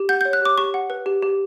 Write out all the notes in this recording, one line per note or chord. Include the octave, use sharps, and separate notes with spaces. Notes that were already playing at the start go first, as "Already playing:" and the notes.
Already playing: G4
F#5 G6
C#5 G6
F#6
G4 D6
G4 C#6
F#5
B4
G4
G4